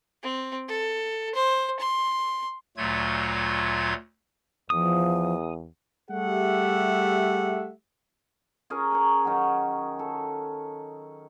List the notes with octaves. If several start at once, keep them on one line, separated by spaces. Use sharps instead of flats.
C4
A4
C5
C6
D2 A#2 F#3 A3 F4 G#6
E2 F3 D#6
G3 A3 G4 G#4 E5 F#5
C#4 G#4 A#4
C#5 A#5
D#3 F#3
A4